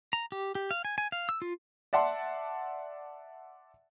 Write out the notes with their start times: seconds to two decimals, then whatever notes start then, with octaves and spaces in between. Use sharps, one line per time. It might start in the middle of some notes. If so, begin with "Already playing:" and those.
0.13 A#5
0.32 G4
0.55 G4
0.71 F5
0.85 G#5
0.98 G#5
1.12 F5
1.29 E6
1.42 F4
1.93 D5 E5 F#5 A5 C6